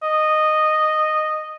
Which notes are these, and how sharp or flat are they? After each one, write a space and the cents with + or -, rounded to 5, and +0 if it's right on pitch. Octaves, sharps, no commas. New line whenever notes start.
D#5 -10